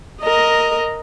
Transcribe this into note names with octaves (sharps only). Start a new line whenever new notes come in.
A#4 D#5